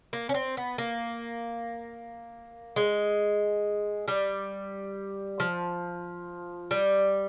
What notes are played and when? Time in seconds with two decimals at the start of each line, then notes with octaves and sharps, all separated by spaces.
0.13 A#3
0.29 C#4
0.34 C4
0.57 B3
0.78 A#3
2.76 G#3
4.08 G3
5.40 F3
6.71 G3